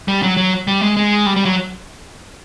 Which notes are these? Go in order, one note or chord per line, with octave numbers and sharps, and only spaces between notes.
G3
F#3
F#3
G3
G#3
G#3
G3
G3
F#3